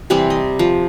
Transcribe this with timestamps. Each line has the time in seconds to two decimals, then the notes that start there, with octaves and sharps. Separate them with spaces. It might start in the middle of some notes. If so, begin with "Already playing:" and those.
0.10 C3 E3 G3 C4
0.30 D#5
0.59 F3